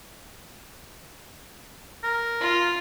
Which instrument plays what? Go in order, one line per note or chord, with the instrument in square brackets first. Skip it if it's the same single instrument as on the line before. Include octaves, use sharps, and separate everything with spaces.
[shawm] A#4
[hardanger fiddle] F4